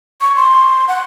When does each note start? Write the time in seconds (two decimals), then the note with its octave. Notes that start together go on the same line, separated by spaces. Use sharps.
0.21 C#6
0.36 C6
0.88 F#5